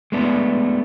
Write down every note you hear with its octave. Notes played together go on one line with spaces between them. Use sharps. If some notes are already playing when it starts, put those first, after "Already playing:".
G#3 A3 B3 D4